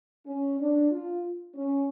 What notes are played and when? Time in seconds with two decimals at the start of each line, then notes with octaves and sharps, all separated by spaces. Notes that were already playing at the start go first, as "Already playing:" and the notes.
0.26 C#4
0.59 D4
0.90 F4
1.54 C#4